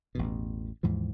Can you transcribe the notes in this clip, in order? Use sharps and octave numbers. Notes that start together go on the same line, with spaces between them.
A1 E2 B2
D#2 G#2 E3 F3